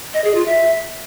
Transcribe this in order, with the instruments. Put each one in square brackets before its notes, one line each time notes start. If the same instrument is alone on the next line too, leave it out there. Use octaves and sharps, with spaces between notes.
[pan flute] D#5
G#4
F4
E5